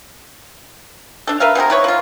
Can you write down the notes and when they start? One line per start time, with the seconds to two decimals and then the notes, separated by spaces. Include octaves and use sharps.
1.27 D4 A4
1.40 A#4 B4 E5 F5
1.55 B2 C4 G#4 A#4
1.70 E4 B4 C#5
1.84 F3 F4